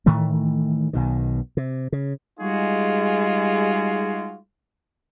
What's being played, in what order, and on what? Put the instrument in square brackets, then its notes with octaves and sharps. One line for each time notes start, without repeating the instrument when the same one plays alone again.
[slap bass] A2 D#3 E3 A3
B1 B2 D#3
C3
C#3
[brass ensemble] G3 G#3 D#4 F4 F#4 G#4